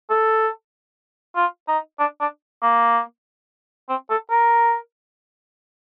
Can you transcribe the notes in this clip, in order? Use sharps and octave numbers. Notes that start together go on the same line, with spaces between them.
A4
F4
D#4
D4
D4
A#3
C4
A4
A#4